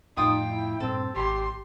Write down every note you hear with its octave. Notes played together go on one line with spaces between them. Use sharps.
F2 A2 D#4 F4 G5 D#6
E4
G2 A#2 C4 A4
G#1 G4 C6